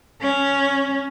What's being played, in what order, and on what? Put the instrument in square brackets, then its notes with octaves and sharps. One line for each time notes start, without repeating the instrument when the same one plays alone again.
[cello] C#4